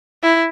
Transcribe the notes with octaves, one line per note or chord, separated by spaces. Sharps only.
E4